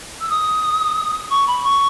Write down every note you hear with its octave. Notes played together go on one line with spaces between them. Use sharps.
E6
D#6
C#6
B5
C#6